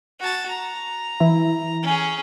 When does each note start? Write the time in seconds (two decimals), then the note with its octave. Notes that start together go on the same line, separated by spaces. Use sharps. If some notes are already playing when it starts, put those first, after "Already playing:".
0.19 F#4 A5
0.49 A#5
1.20 E3 E4
1.83 C#4 G#4